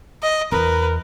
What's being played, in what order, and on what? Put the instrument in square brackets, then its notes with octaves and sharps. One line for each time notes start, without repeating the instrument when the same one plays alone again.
[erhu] D#5
[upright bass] E2 [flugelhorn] A#4 [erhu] B4